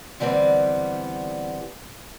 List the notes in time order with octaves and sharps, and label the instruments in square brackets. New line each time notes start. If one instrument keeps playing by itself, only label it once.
[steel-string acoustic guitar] D3 E3 G3 B3 C4